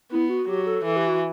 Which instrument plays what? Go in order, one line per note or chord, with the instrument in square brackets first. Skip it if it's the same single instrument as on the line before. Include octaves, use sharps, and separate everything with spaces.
[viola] B3 [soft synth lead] E4
[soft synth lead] F#4
[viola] F#3 [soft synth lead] G4
[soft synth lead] A4
[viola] E3 [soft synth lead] A4
[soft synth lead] G4
F#4